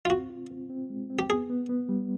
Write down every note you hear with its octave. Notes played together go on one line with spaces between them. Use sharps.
F4
C4 F#4
F4
C4
C4
G#3
C4
G4
B3 G#4
B3
B3
G3